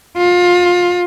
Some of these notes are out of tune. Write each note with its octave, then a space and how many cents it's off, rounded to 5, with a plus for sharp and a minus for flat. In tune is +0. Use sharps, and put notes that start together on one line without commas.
F4 +25